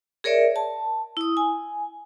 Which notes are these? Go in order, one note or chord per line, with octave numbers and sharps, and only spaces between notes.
G#4 A#4 C#5 D5 E5
A5
E4 D#6
G#5